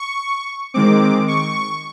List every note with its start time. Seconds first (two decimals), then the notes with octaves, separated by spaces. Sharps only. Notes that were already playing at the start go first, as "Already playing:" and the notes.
Already playing: C#6
0.74 D#3 G#3 C4 D6
1.28 C#6